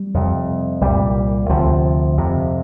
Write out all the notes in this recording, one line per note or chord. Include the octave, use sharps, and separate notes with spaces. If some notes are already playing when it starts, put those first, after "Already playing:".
Already playing: G3
F2 C3
C2 A#2 G3
D2 C3 F3
F2 C3